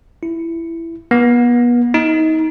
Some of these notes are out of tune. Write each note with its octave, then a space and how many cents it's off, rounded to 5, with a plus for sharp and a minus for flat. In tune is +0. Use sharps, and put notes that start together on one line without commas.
E4 +10
B3 -35
D#4 +25